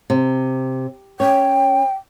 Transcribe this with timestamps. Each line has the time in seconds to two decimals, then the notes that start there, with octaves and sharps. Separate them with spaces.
0.10 C3
1.20 C#4 C#5 G5